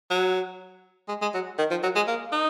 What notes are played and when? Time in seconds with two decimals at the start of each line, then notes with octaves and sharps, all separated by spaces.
0.10 F#3
1.08 G#3
1.22 G#3
1.34 F#3
1.58 D#3
1.71 F3
1.83 F#3
1.96 G#3
2.07 A#3
2.33 D#4